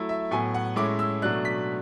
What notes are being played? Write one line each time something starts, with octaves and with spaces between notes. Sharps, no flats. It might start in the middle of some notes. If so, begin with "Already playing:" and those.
Already playing: F#3 A3 E4
E5
A2 F#3 B3 G#5
F#5
A2 G#3 C#4 E4 D6
E6
B2 F#3 A3 D4 F#6
B6